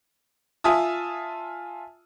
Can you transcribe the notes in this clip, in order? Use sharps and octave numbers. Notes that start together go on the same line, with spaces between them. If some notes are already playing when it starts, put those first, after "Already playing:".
F4 E5 G#5 A5 D#6